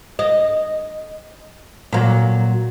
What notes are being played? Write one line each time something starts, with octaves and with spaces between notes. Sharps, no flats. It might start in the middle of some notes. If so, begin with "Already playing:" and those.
D#5
A#2 F#3